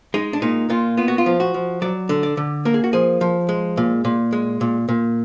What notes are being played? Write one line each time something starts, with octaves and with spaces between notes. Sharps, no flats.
G#3 D#4
D4
A#2 D#4
A#2 F4
B3 F4
F#4
F4
F3
F#4
F3
F#3 D5
D3
D5
D3
A#3 A#4
G#4
F#4
F3 G#4
F3
G#3
A#2
A#2
G#3
A#2
A#2